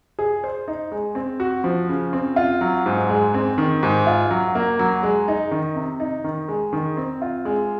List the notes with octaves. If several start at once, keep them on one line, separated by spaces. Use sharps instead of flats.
G#4
C5
D#4
G#3
C4
F#4
F3
C#3
C4
F4
F#3
G#2
G#3
C4
D#3
G#2
F4
F#3
A#3
F#3
G#3
D#4
D#3
C3
D#4
D#3
G#3
D#3
C4
F4
G#3